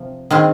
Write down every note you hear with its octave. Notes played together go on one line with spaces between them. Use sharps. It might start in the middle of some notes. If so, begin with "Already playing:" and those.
Already playing: C3 F3
D#3 G#3 C4